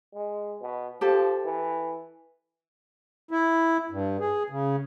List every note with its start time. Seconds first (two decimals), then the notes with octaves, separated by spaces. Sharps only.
0.14 G#3
0.61 B2
1.01 F3 G4 A4
1.45 E3
3.31 E4
3.91 G2
4.20 G#4
4.50 C#3